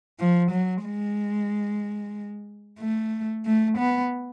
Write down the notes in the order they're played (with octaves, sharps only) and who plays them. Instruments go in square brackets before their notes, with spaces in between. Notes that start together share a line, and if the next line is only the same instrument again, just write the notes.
[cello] F3
F#3
G#3
A3
A3
B3